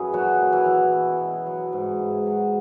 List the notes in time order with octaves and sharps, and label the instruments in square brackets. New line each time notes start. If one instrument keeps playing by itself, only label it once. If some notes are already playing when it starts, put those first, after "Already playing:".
Already playing: [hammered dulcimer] F#2 E3 C#4 G#4
A#2 F#3 F#4
A#2
E3 E4
F#3
B2
B2
F#3
G#2
G#2
F#3